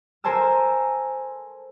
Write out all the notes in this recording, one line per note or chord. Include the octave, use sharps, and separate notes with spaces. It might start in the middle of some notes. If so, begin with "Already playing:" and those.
A4 A#4 C5 G#5 A5 E6